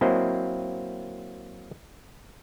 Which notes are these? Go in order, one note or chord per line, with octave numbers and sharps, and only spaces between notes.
F#3 A#3 C4 E4 C5 D#5